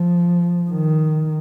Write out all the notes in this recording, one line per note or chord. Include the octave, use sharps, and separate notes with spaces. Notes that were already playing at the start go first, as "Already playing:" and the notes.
Already playing: F3
D#3